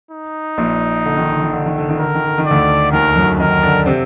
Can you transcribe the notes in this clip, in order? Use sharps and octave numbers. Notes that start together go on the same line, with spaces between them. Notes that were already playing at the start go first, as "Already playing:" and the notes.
D#4
A#1 A#2
D3
D#3
D3
D#3
D3
D#3
D3
D#3
D3 A#4
D#3
D3
D#3
D2 D3 D5
D#2 D#3 A#4
F#2 F#3
D#3 D#4 A#4
D3 D4
C3 C4